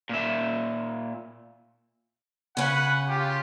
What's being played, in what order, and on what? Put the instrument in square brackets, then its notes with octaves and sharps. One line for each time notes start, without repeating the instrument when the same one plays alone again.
[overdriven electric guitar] A#2 E5
[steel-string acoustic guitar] C#3 C#4 [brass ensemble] B4 F#5
[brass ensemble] F4 G4